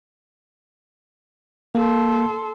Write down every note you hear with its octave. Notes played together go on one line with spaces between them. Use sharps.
A#3 A4 C6